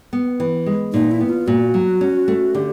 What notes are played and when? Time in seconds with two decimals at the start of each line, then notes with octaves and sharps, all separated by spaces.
0.13 B3
0.40 E3
0.66 G#3
0.93 A#2 D#4
1.11 E4
1.20 B3
1.29 F4
1.47 A#2 F#4
1.74 F#3
2.01 C#4
2.28 A3
2.54 D3 G4